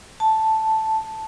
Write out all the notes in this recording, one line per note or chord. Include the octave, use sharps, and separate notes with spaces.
A5